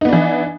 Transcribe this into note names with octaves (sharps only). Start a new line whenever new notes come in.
E3 B3 D4 D#4